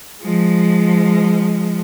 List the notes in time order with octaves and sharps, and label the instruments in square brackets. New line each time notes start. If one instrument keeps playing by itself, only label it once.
[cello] F3 G#3